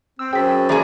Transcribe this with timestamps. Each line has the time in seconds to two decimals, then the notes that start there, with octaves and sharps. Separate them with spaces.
0.19 C4 E6
0.33 F#2 G#4 C5 G5 E6 B6
0.69 E3 A#3 G#4 D5 A#5